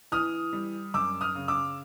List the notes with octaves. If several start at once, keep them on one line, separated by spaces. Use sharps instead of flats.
E3 D#6 F6
G3
F#2 D6 E6
D#6 F6
C#3
D6 E6